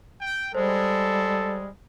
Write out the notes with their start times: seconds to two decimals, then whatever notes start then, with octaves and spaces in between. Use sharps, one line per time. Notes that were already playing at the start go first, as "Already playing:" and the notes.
0.21 G5
0.55 G3 G#3 A4 C5